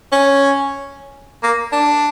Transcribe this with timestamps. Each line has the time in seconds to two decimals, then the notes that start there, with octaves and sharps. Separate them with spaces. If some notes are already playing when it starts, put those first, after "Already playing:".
0.12 C#4
1.43 A#3
1.73 D4